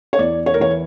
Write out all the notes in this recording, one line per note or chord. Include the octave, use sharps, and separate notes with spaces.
C#5
E2 D5
C#5
A#4
E3 C#5